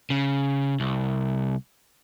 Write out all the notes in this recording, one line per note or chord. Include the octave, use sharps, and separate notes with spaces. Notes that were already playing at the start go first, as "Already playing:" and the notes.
C#3
C2